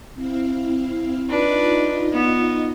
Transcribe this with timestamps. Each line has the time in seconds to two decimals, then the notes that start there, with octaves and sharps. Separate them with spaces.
0.15 C4 E4 F5
1.29 D4 D#4 F4 B4 D#5
2.13 B3